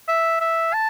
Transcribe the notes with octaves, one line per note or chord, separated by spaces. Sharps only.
E5
E5
A5